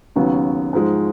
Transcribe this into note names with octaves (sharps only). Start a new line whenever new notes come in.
D#2 C#3 F#3 B3
G#2 F3 G#3